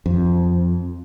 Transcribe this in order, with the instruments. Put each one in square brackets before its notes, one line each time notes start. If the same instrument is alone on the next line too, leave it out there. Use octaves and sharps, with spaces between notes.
[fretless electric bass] F2